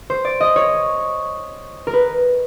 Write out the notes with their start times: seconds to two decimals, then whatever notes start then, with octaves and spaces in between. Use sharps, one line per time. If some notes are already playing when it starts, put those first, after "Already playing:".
0.10 C5
0.25 D5
0.40 D#5
0.56 C#5
1.87 A#4
1.93 B4